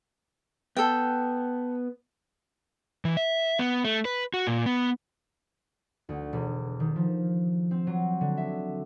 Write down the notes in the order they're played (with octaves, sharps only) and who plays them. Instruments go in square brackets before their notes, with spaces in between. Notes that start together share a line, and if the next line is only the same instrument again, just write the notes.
[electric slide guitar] B3 [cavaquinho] A4 G5
[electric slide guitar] E3
E5
B3
A3
B4
F#4
A#2
B3
[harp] D2
E1
D#3
F3
C4
F#3
D3
E5